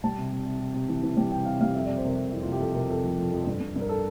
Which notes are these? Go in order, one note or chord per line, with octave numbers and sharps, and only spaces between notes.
G3 A5
C3
C3
C3
C3
C3
E3
E3
G3
C3 G5
C3 F5
G3 F5
F2 E5
D5
C3
C5
C3 A#4
C3
F2 E4
F4
C3
G4
F2 A4
C3 A#4
F2 A4
F3
F3
F2
G2
G2
G2
A#4
A4